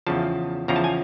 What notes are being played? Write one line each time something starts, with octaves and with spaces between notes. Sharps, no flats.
E2 C#3 F3 A5
E2 C#3 F3 A#5
A5
G#5